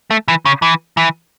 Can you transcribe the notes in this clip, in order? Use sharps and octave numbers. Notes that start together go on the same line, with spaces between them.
A3
E3
C#3
E3
E3